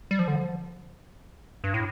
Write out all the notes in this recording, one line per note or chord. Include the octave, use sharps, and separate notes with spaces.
G3
F3
D3
F3
G2
A2